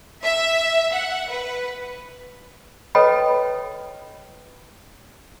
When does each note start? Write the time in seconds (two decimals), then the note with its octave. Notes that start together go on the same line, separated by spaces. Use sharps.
0.25 E5
0.95 F#5
1.31 B4
2.95 A4 B4 C#5 D#5 G5 B5